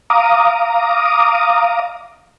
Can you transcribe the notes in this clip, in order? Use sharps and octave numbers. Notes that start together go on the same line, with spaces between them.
F5 A#5 D6 D#6